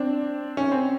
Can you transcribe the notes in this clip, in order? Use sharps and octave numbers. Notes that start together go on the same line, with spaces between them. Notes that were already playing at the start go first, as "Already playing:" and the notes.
Already playing: C4 D4
C#4
C4